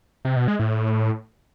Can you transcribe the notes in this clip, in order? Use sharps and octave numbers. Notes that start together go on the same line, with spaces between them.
C3
B2
G#3
A2